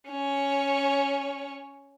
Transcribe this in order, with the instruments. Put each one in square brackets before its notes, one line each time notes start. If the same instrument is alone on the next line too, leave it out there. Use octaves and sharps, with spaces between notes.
[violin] C#4 C#5